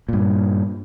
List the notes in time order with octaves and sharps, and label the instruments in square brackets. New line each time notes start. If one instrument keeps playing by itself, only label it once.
[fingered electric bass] G2 A#2